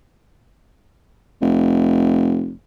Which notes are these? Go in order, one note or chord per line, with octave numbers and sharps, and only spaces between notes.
F1